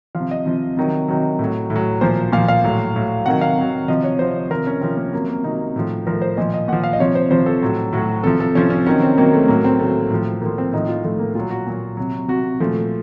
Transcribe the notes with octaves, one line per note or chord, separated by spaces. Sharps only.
F3 F5
C3
D#5
C3 F3
C3 D#3 F#3
C3 D#3 F#3
A2 F#3
A2
F#3
A#2 F3 C5
A#2 F3 F5
F5
A2 F#3
A2 F#3
C3 D#3 F#3 F#5
F5
C3 D#3 F#3
C3 F3 D#5
C#5
C3 F3 C5
C3 F3 A#4
C#4
C3 F3 C4
A#3
C3 F#3 A#3
A#3
C3 F#3 D#4
A2 F3
A2 F3 A#4
C5
A#2 F3 D#5
D#5
A#2 F3 F#5
F5
D#5
C3 F3 C#5
C5
C3 F3 C5
A4
A2 F#3
A2 F#3 F#4
C3 F3 A4
A4
C3 F3 C#4
C#4
C3 D#3 F#3 C#4
C4
C3 D#3 F#3 A#3
A3
A2 F#3 A#3
C4
A2 F#3 A3
A2 F3
A2 F3 A#3
C4
A2 F3 D#4
F4
A2 F3 A3
A#3
A#2 F#3 F4
F#4
A#2 F#3
C3 F#3
C3 F#3 F#4
A#2 F3 A3